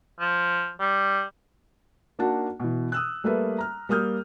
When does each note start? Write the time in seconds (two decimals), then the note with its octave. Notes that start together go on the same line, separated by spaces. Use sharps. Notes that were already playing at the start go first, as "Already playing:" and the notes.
0.20 F3
0.80 G3
2.19 A#3 D4 D#4 F#4 F#5 A5
2.60 B2 E3
2.92 D#6 E6 F#6
3.24 G3 A3 A#3 A4 B4 E5
3.58 A#5 F6
3.89 G3 A#3 D#6 F6 G6